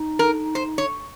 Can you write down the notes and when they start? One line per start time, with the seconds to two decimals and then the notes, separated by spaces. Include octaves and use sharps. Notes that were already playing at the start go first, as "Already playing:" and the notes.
Already playing: D#4
0.19 A#4
0.55 C5
0.78 C#5